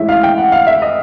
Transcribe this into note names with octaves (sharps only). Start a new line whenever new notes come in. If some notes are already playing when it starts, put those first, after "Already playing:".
Already playing: A2 E3 G#3 C#4 E4 E5
F5
G5
F#5
F5
E5
D#5